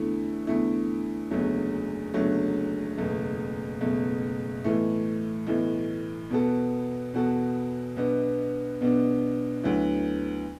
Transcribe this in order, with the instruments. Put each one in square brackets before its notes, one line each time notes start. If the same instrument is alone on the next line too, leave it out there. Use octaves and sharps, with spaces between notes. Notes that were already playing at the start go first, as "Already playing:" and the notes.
Already playing: [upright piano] E2 D3 A3 E4
E2 D3 A3 E4
F#1 E2 D3 F#3 A3
F#1 E2 D3 F#3 A3
F#1 E2 B2 A3
F#1 E2 B2 A3
B1 A2 E3 A3
B1 A2 E3 A3
E2 B2 B3 F#4 A4
E2 B2 B3 F#4 A4
B1 B2 B3 D4
B1 B2 B3 D4
D2 D3 F#3 B3 E4